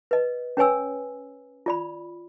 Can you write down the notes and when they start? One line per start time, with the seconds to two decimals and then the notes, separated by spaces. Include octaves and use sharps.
0.11 B4 D#5
0.57 C#4 B4 C#5 G#5 E6
1.66 F4 D5 B5